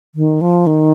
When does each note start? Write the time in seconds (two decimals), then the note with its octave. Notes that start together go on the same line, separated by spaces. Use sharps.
0.15 D#3
0.41 F3
0.67 D#3